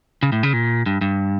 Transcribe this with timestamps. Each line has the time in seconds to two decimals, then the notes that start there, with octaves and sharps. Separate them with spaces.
0.23 C#3
0.32 A2
0.43 C#3
0.53 A#2
0.86 G2
1.01 G2